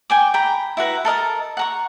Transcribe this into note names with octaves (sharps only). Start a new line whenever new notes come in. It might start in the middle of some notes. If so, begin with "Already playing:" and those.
G5 G#5 D6
G5 A#5 B5
E4 F#4 B4 A#5
A4 A#4 D#5 A5
F#5 A#5 C#6